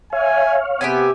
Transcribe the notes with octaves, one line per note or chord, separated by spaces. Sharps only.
C#5 E5 F5 G#5
C3 B3 G4 E5 G#5